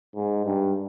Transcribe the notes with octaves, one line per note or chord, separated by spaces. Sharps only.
G#2
G2